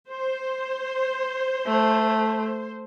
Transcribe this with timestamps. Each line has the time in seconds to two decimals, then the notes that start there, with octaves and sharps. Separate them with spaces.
0.11 C5
1.66 A3